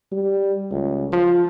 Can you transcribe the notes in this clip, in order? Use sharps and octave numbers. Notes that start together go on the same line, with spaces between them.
G3
C#2
F3